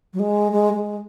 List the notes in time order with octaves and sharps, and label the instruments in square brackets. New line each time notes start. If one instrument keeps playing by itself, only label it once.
[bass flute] F#3
G#3
G#3
G#3